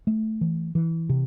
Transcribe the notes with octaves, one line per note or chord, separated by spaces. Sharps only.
A3
E3
E3
C3